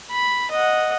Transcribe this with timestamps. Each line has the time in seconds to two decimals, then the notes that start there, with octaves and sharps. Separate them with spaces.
0.11 B5
0.51 D#5 F#5